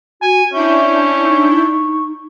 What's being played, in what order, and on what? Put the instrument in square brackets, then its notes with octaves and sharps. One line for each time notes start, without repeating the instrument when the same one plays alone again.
[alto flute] F#4 [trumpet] G#5
[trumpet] C#4 [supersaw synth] D4 E4 G6 [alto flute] E5 [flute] C#6
[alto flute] D#4